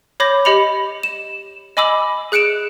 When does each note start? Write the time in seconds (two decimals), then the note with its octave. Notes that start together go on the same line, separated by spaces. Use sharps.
0.20 C#5 B5 D6 G6 A#6
0.45 G4 D#5 B5 C#7 F7
1.03 E7
1.77 D#5 G#5 B5 D6 E6 F#7
2.32 G#4 F#6 C#7 D7 E7